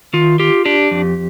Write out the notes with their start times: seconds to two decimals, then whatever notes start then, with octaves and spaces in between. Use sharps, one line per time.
0.13 D#3 F4
0.40 F4 G4
0.65 D4 G4
0.91 F2